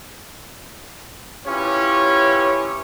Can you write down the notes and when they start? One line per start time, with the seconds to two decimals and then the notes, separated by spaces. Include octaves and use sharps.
1.47 C#4 E4 F4 G4 B4 C#5